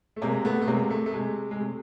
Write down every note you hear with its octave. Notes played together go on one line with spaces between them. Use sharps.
A3
C3 G#3 A#3
A3 B3
A3
C3 G#3 A#3
A3
A3
C3 G#3
G#3
C3 A3